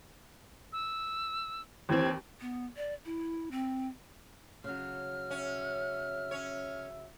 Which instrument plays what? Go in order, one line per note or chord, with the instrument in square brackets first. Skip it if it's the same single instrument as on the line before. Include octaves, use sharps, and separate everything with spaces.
[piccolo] E6
[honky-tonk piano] D#2 E3 C4 [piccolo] G#6
[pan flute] B3
D5
E4
C4
[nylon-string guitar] C#3 F#3 [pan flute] F6
[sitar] C#4 [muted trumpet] E5
[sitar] C#4 C#5